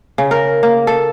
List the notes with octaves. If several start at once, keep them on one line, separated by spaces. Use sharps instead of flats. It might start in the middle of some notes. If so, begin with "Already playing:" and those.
C#3
A#4
A#3
A4